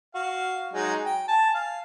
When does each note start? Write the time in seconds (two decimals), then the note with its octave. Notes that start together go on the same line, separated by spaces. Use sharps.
0.15 F#4 F5
0.73 F#3 G#3 D#4
1.05 G5
1.28 G#5 A5
1.54 F5